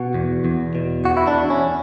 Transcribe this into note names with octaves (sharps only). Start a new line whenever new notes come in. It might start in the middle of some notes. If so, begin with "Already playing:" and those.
Already playing: B2 F#4
E2
E2
B2
E2 F#4
E4
D4
E2
C#4